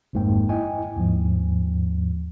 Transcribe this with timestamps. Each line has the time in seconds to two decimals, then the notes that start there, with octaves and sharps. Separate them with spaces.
0.13 G#1 F2 G#2 A#3 G5
0.49 E4 D#5 G5 G#5
0.96 D#2 G#2 F3